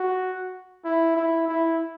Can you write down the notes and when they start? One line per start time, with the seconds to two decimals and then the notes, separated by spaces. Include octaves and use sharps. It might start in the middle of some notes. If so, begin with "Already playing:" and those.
Already playing: F#4
0.85 E4
1.17 E4
1.48 E4